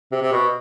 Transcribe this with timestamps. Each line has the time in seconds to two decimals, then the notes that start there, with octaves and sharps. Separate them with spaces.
0.12 C3
0.22 C3
0.32 B2